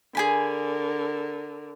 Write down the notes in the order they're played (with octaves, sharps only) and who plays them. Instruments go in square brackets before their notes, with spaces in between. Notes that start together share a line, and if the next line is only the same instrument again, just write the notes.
[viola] D3 A#4 [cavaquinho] G#4 G#5 B5